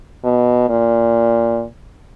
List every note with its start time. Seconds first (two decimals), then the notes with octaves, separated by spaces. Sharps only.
0.24 B2
0.69 A#2